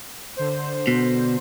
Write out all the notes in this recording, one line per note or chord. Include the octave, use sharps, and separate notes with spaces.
D3 C5
B2